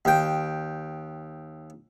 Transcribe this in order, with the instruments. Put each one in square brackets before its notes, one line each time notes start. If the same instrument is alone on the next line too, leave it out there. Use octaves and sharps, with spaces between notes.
[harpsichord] D#2 G5